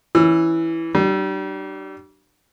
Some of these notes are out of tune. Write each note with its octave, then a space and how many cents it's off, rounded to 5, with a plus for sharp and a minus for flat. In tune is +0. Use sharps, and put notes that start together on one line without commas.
E3 +0 C#4 +0 E6 +35
G3 -35 D4 +35